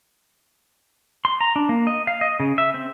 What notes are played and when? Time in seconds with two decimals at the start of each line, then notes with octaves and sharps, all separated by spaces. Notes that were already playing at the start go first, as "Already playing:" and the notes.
1.25 C6
1.41 A#5
1.56 D4
1.69 A#3
1.87 D#5
2.07 F5
2.21 D#5
2.40 C#3
2.58 E5
2.74 C4